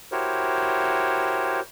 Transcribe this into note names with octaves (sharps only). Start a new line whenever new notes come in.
E4 F#4 G4 A#4 C5 C#5